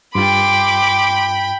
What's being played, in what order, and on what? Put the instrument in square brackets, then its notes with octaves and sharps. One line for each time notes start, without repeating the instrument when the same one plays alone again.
[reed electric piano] G2 F4 [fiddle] G5 B5 [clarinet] C6 [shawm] D6